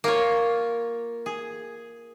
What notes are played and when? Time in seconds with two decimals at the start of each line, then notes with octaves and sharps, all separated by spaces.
0.04 A#3 F4 C#5
1.26 G#4